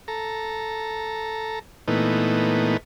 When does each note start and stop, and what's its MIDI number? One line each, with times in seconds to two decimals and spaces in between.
0.08 1.59 69
0.08 1.59 82
1.88 2.77 46
1.88 2.77 52
1.88 2.77 57
1.88 2.77 59
1.88 2.77 63